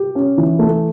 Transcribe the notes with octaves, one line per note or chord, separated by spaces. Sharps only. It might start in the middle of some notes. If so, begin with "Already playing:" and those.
Already playing: G4
C#4
E3
A3